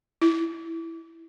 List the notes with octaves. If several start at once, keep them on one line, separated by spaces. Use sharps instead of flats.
E4